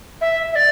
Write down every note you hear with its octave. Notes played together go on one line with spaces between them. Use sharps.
E5
E5
D5